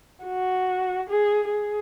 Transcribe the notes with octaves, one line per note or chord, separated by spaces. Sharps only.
F#4
G#4
G#4